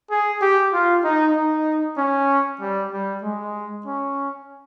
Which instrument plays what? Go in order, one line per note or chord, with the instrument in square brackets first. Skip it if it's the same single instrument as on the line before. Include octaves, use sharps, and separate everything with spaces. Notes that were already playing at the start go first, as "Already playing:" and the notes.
[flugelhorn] G#4
G4
F4
D#4
D#4
C#4
G3
G3
G#3
C#4